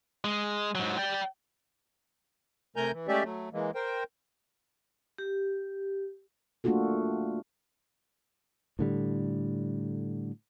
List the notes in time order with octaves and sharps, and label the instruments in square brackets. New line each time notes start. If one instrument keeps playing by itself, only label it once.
[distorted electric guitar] G#3
G#2 F#3
D5 G5
[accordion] C3 A3 A#4 G#5 A#5 G6
E3
G#3 A3 C#4 G4 D5 E5
F#3 A3
E3 G#3 A#3
A#4 C5 G5
[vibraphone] G4
[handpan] A3 A#3 D4 F4 F#4 A4
[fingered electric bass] A2 D3 G3